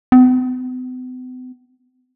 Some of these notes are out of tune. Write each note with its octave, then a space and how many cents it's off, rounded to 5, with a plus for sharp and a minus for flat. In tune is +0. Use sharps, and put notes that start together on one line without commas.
B3 +45